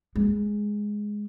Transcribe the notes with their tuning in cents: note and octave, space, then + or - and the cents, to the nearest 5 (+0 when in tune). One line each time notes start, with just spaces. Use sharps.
G#3 +0